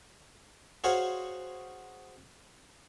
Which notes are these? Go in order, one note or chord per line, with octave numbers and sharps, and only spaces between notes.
F#4 G#4 C5 C#5 F5